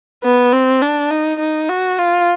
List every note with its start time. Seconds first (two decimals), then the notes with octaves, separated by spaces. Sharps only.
0.24 B3
0.52 C4
0.82 D4
1.11 D#4
1.39 D#4
1.69 F#4
1.98 F4